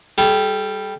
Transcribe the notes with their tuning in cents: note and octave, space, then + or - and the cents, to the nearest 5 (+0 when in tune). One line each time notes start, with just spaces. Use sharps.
G3 +0 A4 -35